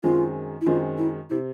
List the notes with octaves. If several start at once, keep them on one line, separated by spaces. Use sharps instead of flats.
F#2 D#3 G#3 C4 F4
E4
F#2 D#3 G#3 C4 F4
E4
C3 E4